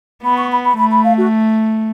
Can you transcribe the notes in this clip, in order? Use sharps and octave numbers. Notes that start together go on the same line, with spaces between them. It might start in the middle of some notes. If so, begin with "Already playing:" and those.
B3 B5
C#6
B5
B5
A3 B5
B5
F5
F#4